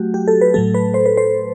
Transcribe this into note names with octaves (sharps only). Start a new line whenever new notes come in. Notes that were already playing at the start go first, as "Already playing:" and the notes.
Already playing: F#3 A3 F#4 G4
G4
A4
B4
A2 F#3 A3 A4
B4
C5
B4
C5